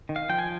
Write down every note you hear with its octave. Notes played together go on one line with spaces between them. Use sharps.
D#3
F5
F3 G5
G#5